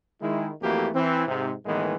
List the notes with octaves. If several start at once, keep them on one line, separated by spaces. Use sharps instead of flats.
D#3 G#3 E4
F2 E3 A3 A#3 F#4 G4
E3 C4
G#2 C3
A2 D#3 E3 G#3 A#3 B3